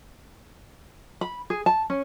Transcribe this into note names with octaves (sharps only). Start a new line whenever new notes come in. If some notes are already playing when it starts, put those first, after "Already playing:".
B5
G#4
A5
C#4